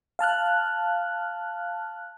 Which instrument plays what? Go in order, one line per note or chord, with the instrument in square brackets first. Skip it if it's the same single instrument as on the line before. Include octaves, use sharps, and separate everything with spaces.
[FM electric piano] F5 A5 F6 F#6